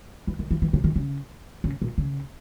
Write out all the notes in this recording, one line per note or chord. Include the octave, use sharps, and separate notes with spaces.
E3
D#3
E3
E3
C#3
D#3
C#3
C#3
A#2
C#3